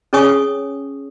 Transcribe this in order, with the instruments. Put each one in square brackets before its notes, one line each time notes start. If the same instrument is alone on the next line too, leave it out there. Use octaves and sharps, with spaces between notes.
[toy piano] C#4 G#4 C#5 G#5 C#6 D#6